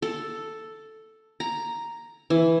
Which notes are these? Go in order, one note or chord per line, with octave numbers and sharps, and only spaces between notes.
A4
A#5
E3